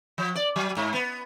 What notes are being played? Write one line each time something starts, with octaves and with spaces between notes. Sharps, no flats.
F3
D5
F#3
G#2
B3